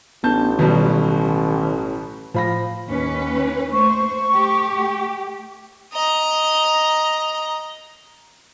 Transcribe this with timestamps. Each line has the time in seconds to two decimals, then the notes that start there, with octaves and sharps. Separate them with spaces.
0.24 A1 B3 D4 A5 G6
0.59 B2 D#3 F#3 G3
2.34 A2 F3 F5 B5 A#6
2.88 D#2 C#4 B4
3.71 A3 C5 C#6
4.33 A3 G4
5.93 D#5 A#5